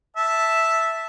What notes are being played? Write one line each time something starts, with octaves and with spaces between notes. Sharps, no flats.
E5 A5